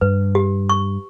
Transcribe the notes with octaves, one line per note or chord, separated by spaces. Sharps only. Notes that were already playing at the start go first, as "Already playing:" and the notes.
G2 B4
G4
C#6